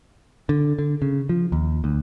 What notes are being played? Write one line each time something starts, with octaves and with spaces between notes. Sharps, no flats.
D3
D3
C#3
F3
D#2
D2